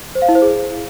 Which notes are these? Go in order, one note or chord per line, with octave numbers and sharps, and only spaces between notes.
C5
F5
E4
C5
G#4